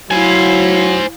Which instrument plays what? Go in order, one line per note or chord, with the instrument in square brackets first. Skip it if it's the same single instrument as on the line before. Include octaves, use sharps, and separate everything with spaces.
[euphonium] F#3 [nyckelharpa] E4 F5 [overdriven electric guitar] C5 G#5